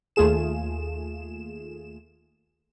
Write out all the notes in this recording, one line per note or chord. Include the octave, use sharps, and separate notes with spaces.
D#2 A3 F4 G#4 E7